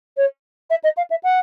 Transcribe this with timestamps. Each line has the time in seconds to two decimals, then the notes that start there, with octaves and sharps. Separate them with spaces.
0.17 C#5
0.70 E5
0.83 D#5
0.97 F5
1.10 E5
1.23 F#5